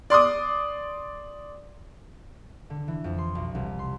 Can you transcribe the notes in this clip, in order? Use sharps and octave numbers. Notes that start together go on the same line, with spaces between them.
D5 C6 D6 D#6
D3
E3
F2
C6
B1
C2
C6